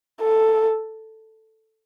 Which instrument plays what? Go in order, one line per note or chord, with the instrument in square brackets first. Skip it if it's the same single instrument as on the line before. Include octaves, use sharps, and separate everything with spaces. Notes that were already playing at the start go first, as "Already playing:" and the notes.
[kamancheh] A4